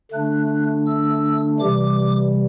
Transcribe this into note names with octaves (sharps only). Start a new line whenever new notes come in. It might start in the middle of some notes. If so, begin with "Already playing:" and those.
D3 A3 D4 F#6
E6
C3 E3 G3 D6